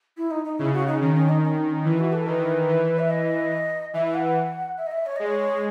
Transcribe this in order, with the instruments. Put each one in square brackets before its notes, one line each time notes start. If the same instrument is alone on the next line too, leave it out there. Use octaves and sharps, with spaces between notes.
[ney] E4
D#4
D#4
[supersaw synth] C#3 [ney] E4
[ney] F#4
D#4
[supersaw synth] D#3 [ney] C#4
[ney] C#4
D#4
C#4
D#4
C#4
[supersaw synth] E3 [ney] E4
[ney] F#4
A4
[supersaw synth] D#3 [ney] B4
[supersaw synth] E3
[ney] E5
D#5
[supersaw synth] E3 [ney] E5
[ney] E5
F#5
E5
D#5
E5
C#5
[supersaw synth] G#3 [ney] D#5
[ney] C#5